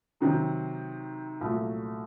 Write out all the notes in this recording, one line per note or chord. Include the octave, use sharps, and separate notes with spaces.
C3 D#3 F#3
C2 A#2 F#3 A3